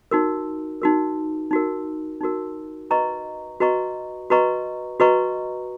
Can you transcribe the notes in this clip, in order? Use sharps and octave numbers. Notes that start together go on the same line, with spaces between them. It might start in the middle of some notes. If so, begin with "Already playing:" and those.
D#4 F#4 A#4
D#4 F#4 A#4
D#4 F#4 A#4
D#4 F#4 A#4
F#4 B4 D#5 A#5 C#6
F#4 B4 D#5 A#5 C#6
F#4 B4 D#5 A#5 C#6
F#4 B4 D#5 A#5 C#6